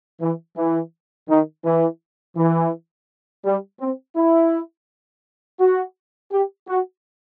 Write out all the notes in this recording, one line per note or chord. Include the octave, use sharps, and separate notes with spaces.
E3
E3
D#3
E3
E3
G3
C4
E4
F#4
G4
F#4